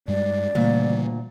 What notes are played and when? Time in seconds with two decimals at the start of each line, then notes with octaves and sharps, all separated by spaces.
0.08 G2 G3 G#3 D5
0.55 D2 A#2 C#3 E3 G3